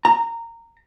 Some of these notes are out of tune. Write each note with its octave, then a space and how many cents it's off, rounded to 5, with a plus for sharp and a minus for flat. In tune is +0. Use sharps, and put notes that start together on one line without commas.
A#5 -15